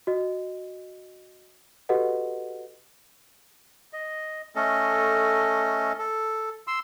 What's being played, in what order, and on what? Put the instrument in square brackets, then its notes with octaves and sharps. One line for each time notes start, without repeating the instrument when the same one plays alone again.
[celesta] F#4 D#5
F#4 G4 A4 B4 D#5 F#5
[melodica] D#5
A3 C#4 A4 D#5
A4
C6 E6